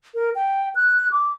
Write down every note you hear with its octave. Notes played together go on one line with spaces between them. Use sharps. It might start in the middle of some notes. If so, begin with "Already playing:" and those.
A#4
G5
F#6
D6